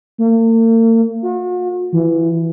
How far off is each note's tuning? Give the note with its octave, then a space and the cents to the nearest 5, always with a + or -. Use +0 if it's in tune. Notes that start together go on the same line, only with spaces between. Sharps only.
A#3 -45
F#4 -45
E3 +10